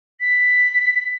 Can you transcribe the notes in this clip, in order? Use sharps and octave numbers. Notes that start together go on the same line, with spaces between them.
B6